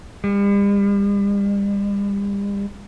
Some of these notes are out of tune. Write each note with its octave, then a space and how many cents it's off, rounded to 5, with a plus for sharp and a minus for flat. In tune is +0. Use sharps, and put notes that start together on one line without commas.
G3 +40